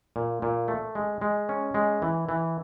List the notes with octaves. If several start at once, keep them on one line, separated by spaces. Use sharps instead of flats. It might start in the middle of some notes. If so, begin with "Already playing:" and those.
A#2
A#2
A3
G#3
G#3
C#4
G#3
E3
E3